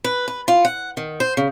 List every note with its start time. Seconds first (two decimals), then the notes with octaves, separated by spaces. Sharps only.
0.04 B4
0.28 B4
0.48 F4
0.65 F#5
0.97 D#3
1.20 C5
1.37 C#3